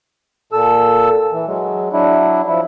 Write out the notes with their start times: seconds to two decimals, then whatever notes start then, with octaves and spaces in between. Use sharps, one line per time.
0.52 A#2 A4 E6
1.32 E3
1.47 F#3 G#3
1.93 F#3 D4 E4
2.48 F3 E4